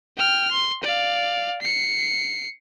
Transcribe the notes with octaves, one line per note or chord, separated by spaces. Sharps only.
G5 F6
C6
D5 F5
C7 C#7